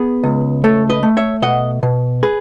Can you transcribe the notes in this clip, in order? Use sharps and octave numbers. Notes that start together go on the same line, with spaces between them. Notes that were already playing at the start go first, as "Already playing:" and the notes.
Already playing: B3 G#4
C#2
A3 A4 C#5
B4 D#5
A3
C#5 E5
B2 D#5 F#5
B2
G#4 B4